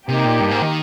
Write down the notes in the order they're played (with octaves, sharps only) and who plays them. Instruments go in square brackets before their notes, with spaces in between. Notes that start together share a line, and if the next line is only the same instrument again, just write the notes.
[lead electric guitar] C3 [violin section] A#3 D#4 G4
[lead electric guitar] A#2
G2
G#2
D#3